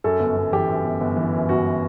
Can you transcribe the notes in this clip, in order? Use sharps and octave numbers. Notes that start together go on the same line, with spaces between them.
F#2 A4
G1
G1
E3 G4
F#2
G1
G1
E3
F#2
G1 F#4